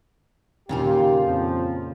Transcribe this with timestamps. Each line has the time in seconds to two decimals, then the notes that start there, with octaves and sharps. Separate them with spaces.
0.69 D#2 A#2 C#3 F4 G4
1.22 F2 F3